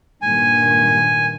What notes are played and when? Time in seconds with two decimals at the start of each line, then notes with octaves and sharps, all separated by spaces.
0.22 G2 A#2 D#3 G#5